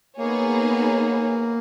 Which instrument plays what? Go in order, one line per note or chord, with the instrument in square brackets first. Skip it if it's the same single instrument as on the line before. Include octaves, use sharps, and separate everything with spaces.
[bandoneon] A#3 [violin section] B3 D#4 G#4 C#5